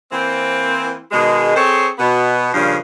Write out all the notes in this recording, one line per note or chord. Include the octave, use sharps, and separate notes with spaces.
E3 A#3 C4
B2 D#3 G#3
C4 G#4 A4 C5 C#5
B2 B3
G2 A#2 C#3 F3